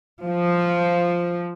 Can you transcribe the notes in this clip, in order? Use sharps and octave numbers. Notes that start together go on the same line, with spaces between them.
F3